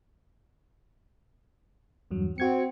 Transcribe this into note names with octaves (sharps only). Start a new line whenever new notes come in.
E2 G2 F#3
C4 F#4 G#6 C#7